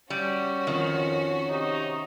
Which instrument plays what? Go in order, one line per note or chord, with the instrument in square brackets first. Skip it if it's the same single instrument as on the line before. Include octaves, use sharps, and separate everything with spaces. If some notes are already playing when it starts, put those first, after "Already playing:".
[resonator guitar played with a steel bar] G3 [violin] C#4 F#4
[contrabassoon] F2 [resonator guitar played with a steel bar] D#3
[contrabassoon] C3 [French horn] D#4